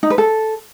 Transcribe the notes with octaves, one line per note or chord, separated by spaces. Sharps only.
D#4
B4
A4